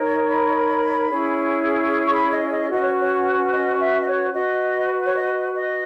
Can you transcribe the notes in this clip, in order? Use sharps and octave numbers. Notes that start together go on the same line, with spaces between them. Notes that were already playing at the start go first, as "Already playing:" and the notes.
Already playing: D#4 A#4 C#5
B5
C#4 E4 G#4 C#5
C#6
B5
D#5
D#5
C#4 F#4 B4 D#5
C#5
C#5
D#5
E5
D#5
C#5
F#4 B4 D#5
C#5
D#5
D#5